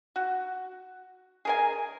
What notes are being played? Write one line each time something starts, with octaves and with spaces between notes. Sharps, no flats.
F#4
G#4 A#4 G#5